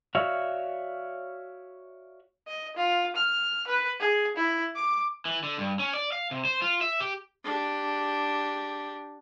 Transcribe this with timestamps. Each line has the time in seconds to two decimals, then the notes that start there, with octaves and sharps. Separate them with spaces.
0.15 F#4 C#5 D5 E5 F5
2.47 D#5
2.76 F4
3.16 F6
3.67 B4
4.00 G#4
4.36 E4
4.75 D6
5.25 E3
5.43 D3
5.58 G2
5.79 C#4
5.93 D5
6.12 F5
6.31 C3
6.45 C5
6.62 F4
6.81 E5
7.00 G4
7.44 D4 G4